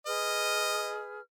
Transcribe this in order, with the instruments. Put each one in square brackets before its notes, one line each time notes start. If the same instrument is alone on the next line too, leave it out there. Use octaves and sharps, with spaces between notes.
[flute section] G#4 B4 F6 [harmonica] D#5